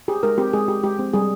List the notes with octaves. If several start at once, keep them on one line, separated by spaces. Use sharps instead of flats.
G4 G#4
G#3 A#4
C4 G4
G#3 G#4
G4
G#3 G4
C4
G3 G#4